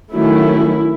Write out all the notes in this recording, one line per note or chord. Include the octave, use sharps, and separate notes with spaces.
D#3 F#3 A3 C#4 E4